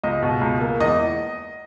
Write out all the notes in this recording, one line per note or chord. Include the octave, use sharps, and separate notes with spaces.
C#2 D#5
B2
C#2
A#3
E2 D#5